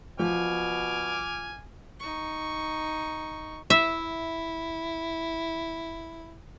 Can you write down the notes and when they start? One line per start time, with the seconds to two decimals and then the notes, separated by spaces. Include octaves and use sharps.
0.19 B2 F3 G#5 D6 F6
1.99 D#4 C#6
3.70 E4 E5